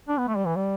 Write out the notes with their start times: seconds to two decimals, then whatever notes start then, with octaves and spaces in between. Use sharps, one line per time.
0.09 D4
0.18 B3
0.28 A3
0.37 G3
0.47 E3
0.56 G3